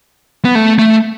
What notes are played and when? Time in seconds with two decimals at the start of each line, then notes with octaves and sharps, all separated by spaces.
0.45 B3
0.55 A3
0.79 A3